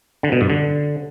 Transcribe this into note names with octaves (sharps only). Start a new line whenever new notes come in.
D3
B2
G2
D3